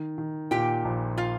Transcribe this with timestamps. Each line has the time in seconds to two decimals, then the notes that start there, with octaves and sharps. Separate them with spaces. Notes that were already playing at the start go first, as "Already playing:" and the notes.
Already playing: D#3
0.18 D#3
0.51 A#2 G4 G5
0.85 A#1
1.18 F4 F5